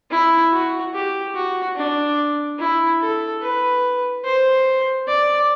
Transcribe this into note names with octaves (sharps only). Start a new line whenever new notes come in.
E4
F#4
G4
F#4
D4
E4
A4
B4
C5
D5